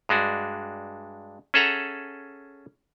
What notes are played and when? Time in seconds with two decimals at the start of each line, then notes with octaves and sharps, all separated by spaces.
0.09 G2 G#3 D4 F#4
1.54 C#4 G#4 A4 E5 F#5 A#5